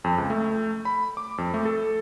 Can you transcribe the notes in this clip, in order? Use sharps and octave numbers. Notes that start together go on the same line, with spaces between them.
F2
C#2
A3
B5
D6
F2
A3
A4